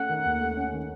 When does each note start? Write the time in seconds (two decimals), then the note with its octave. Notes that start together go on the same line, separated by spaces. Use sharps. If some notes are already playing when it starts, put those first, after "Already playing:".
Already playing: A3 C#4 F#5
0.09 D#3
0.25 D#2
0.41 A3
0.57 C#4
0.73 D#3